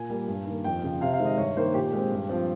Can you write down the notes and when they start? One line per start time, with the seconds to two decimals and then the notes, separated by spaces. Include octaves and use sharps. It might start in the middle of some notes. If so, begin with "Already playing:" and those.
Already playing: A#2 G#5
0.10 G3 A#3
0.28 G2
0.47 D#3 A#3
0.64 F2 G5
0.84 C#3 F3
1.01 C3 F5
1.13 F5
1.20 D#3 G#3 C4
1.25 D#5
1.38 G2 C#5
1.57 D#3 A#3 C5
1.74 A#2 G4
1.93 G#3 C4
2.11 G2
2.29 F3 C4